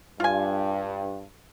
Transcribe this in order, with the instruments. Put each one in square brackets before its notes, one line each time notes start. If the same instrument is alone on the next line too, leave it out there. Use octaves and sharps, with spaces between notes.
[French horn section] G2 [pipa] F4 G#5